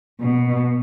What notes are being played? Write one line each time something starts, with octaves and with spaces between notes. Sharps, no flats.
B2